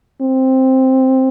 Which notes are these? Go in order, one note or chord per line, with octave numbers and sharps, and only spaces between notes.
C4